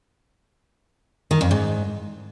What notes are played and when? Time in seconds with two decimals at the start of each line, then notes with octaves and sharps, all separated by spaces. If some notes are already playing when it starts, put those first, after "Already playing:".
1.31 D#3
1.41 F2
1.51 G#2